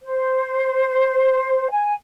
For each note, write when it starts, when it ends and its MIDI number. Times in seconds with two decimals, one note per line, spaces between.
0.02 1.67 72
1.70 1.94 80